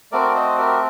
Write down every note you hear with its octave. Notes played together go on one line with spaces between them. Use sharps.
A3 C4 F#4 A#4 D5
C5 D#5
G4 A#4